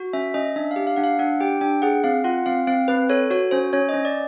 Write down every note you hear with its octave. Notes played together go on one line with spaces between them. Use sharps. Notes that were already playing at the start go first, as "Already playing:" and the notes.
Already playing: F#4
C#4 E5
C#4 D#5
D4 E5
F5
G4
F5
D4 F#5
F5
D4 F#5
G4 G5
D4 G5
G#4 F#5
C4 F5
F4 F#5
C4 F5
C4 F5
C4 B4
A4 C#5
F#4 C#5
C#4 C5
C#4 C#5
D#5
C#4
D5